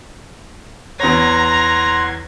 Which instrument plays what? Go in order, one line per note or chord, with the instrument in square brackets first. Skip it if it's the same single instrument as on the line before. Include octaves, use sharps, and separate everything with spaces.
[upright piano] E2 C#5 [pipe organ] F#5 C6 G#6 [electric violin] A#5